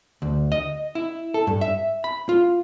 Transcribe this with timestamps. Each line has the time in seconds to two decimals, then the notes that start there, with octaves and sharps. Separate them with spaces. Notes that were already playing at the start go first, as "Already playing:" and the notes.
0.22 D2
0.52 D#5
0.95 E4
1.34 A4
1.47 G2
1.61 E5
2.04 B5
2.29 F4